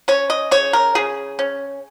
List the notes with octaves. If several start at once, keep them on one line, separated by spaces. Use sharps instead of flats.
C#4 C#5
D#5
C#3 C#5
A#4
C#3 G#4
C#4